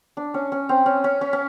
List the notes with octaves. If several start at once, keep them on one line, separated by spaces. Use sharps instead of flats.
D4
C#4
C#4
C4
C#4
C#4
C#4
C#4